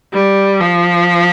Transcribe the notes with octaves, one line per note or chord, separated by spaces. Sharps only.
G3
F3